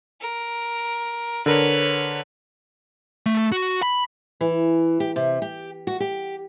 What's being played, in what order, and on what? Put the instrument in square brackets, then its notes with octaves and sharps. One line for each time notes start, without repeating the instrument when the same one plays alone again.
[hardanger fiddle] A#4
[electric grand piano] D3 A#4 [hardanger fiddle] B4 C#5
[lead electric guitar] A3
F#4
B5
[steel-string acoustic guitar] E3
G4
C3
G4
F#4
G4